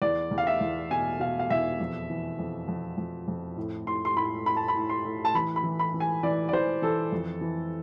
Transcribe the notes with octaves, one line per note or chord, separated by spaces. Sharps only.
E2 D5
E2
F5
E5
E2
B2 G#5
B2 F5
F5
E2 E5
F2
E3
F2
F2
F2
F2
A2
A2 C6
C6
A2 B5
A2 B5
A5
B5
A2
C6
A2
A5
E3 B5
B5
E3
B5
E3
G#5
E3 D5
D5
E3 C5
E3 A4
F2
E3